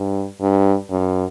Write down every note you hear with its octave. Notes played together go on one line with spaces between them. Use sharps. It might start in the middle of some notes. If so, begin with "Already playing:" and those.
Already playing: G2
G2
F#2